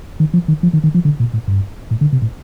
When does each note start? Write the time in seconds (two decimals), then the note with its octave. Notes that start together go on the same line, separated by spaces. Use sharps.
0.20 D#3
0.34 F3
0.48 D#3
0.63 F3
0.73 D#3
0.84 D#3
0.94 F3
1.05 D3
1.20 A#2
1.33 A2
1.48 G2
1.91 A2
2.01 D3
2.12 C3
2.22 A2